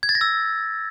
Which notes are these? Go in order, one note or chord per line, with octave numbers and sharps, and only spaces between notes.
G#6
A6
A#6
E6